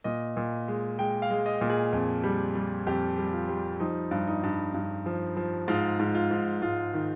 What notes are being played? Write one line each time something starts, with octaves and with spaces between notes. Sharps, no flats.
A#2 D#5
A#2
G#3
G#3 G5
F5
G#3
D#5
A#2
G#4
F2
G3
G3
F2 G4
G3
F4
G3
F3 D#4
G2
D#4
G2
G2
F3
F3
G#2 F4
G#2
F4
G#2
G#2 F4
D#3